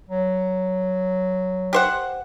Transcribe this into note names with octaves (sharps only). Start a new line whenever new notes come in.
F#3
G4 C5 F#5